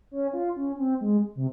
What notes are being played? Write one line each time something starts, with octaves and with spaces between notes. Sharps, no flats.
C#4
F4
C#4
C4
G#3
C3